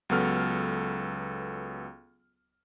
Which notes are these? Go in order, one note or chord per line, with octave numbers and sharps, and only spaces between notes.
C#2 F#3 B3 A4 F6